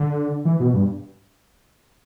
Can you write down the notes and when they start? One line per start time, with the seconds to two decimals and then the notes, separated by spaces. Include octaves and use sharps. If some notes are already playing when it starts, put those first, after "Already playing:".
Already playing: D3
0.45 E3
0.60 B2
0.74 G2